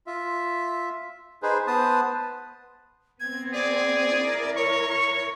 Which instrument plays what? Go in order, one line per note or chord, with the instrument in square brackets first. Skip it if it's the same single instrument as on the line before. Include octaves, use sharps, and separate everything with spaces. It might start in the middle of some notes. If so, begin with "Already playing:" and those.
[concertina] F4 E5
D#4 G#4 B4 C5
B3 B4 C5 A5 D#6
[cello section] B3 C4 [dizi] G#6
[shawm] G#4 [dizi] D5
[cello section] E4 A#4
[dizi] C#5 [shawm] C#6
[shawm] C#6